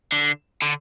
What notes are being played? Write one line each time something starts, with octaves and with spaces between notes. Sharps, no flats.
D3
D3